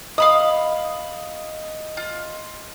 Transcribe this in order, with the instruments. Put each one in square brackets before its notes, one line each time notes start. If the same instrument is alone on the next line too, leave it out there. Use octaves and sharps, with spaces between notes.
[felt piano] D#5 [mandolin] F5 B5 D#6
[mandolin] F4